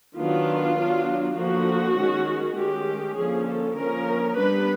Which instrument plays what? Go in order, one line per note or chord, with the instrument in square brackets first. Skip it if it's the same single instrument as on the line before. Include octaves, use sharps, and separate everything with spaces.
[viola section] D#3 F#3 B3 D4 F4
F#3 B3 D4
D3 F3 A#3 F#4
D#3 G#3 C#4
D#3 G#3 C#4 G4
D3 F3 A#3 C#4 G#4
A4
D3 F3 A#3 C#4 A#4
G3 B3 D4 B4